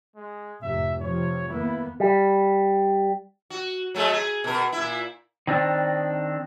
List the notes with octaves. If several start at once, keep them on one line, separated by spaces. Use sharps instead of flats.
G#3
F1 G#2 C3 E5
C3 F3 C#5
D#2 A#3 B3 E4
G3
F#4
F#3 G#3 A3
G#4
B2 A#4
A#2 E4
D#3 C4 D4